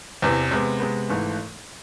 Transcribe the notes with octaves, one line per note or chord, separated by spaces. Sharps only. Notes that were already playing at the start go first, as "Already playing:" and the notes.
E2 C3 E3
C3 G#3 B3
C3 G#3 B3
G#1 G#2 E3 A3